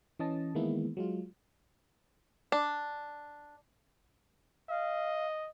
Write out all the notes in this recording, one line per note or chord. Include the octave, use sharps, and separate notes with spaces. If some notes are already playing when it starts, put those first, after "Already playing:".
E3 C#4 D#5 A5
D#3 E3 G#3 A#3 B3 E4
F#3 G#3 F4
D4
D#5 F5